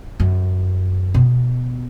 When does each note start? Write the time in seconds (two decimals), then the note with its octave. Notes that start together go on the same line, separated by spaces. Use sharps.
0.20 F#2
1.14 B2